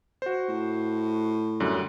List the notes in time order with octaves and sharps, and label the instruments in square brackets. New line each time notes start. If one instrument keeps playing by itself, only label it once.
[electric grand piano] F#4 C5
[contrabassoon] A2
[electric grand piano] F#2 D3 G3